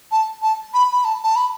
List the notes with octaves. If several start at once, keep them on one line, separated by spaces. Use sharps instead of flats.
A5
A5
B5
B5
A5
A5
B5